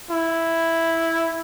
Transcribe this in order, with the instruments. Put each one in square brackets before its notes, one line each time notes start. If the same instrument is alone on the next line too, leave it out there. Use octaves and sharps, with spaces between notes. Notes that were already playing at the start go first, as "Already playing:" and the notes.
[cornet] E4